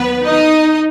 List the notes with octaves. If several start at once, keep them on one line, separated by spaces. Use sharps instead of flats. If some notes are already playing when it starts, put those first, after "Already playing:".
Already playing: D#2 D#3 F#3 B3 B4
D#4 D#5